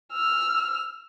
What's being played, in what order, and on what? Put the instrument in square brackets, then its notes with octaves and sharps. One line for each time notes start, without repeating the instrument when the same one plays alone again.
[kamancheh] E6 F6